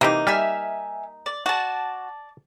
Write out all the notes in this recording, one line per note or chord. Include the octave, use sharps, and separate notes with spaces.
C3 E3 A#3 D#4 G4
G3 E5 G#5 F6
D5
F#4 D5 A5